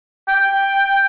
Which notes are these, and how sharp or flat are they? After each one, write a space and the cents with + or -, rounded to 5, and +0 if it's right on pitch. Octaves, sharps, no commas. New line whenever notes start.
G5 +5